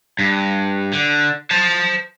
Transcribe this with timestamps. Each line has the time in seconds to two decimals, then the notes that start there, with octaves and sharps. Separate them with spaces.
0.19 G2
0.93 D3
1.51 C5 A5